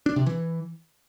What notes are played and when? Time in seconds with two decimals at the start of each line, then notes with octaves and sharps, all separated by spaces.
0.06 D4
0.16 C3
0.26 E3